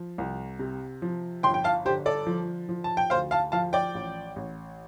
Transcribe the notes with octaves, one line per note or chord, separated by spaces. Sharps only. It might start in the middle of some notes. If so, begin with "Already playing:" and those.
Already playing: F3
C2
C3
F3
G1 G5 C6
G5
F5 A5
D3 G4 C5
A4 D5
F3
F3
A5
G5
D2 C5 F5
F5 A5
F3 F5 A5
D5 G5
A1
A1